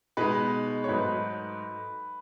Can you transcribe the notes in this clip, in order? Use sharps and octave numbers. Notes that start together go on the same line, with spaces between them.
B2 G#3 D#4 B4
C#5
G#2 F#3 A3 D#4 B4